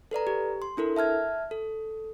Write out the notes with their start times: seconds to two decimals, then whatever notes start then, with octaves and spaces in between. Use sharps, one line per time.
0.11 A4 B4 D5 A#5
0.27 G4
0.62 C6
0.77 D4 E4 A4 A#4
0.96 E5 A5 F6 G#6
1.51 A4